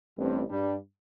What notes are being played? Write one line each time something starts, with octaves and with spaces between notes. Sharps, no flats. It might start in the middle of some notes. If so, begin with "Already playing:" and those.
A1 G2 G3 C4
G2 G3 D4